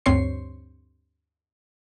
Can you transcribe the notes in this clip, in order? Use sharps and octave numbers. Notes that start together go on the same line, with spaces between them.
D2 G2 C4 C#5 C6 C7